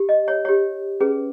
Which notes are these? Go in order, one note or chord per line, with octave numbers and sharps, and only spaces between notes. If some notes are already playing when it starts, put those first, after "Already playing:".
Already playing: G4
D#5
C#5
G4 C#5
C#4 G#4 B4